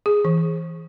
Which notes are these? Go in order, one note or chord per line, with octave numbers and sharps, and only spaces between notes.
G#4
E3